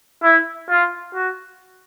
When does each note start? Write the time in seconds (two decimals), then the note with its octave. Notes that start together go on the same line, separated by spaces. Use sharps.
0.23 E4
0.69 F4
1.15 F#4